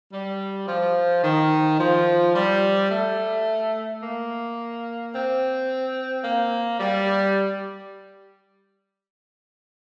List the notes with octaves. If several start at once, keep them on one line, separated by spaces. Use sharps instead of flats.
G3
F3
D#3
F3
G3
A3
A#3
C4
A#3
G3